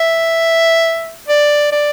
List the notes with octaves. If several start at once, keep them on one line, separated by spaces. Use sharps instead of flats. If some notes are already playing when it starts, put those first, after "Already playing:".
Already playing: E5
D5
D5